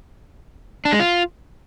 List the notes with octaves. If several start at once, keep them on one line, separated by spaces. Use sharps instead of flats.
D4
G#3
F4